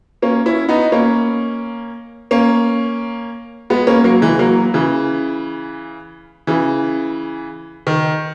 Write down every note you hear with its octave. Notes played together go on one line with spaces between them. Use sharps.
A#3 C#4
C#4 E4
B3 D#4
A#3 C#4
A#3 C#4
G#3 B3
A#3 C#4
F#3 A#3
E3 G#3
F#3 A#3
C#3 E3
C#3 E3
D#3